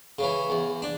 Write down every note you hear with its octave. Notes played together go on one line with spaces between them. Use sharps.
C#3 E3
E2
D4